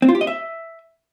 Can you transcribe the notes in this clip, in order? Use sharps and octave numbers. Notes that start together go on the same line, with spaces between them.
C4
F4
G4
D#5
E5